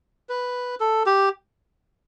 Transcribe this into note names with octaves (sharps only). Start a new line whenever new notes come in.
B4
A4
G4